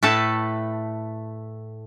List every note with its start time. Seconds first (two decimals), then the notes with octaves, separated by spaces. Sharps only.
0.03 A2 A3 A4 B4 A5